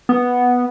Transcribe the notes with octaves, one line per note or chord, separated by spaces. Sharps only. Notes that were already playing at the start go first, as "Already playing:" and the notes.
B3